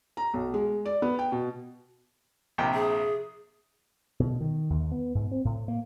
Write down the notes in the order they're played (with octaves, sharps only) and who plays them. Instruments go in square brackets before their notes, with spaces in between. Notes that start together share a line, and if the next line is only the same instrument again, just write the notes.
[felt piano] A#5
B1
G#3
D5
B3
G5
B2
[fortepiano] A#1 C3 G5
[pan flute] G#4
[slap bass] B2
D#3
D#2
B3
G#2
C4
A2
A#3